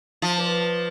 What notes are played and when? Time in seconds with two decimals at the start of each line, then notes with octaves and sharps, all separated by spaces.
0.22 F3
0.37 B4 D5